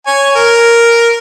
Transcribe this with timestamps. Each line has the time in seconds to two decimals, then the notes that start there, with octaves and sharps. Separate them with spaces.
0.07 C#5 G#5
0.36 A#4